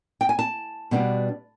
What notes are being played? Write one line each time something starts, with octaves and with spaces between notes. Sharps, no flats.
G5
G#5
A5
B2 G3 B3 D4